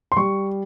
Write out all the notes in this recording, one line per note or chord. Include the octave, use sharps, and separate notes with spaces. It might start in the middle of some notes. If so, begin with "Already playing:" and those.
C6
G3 C#6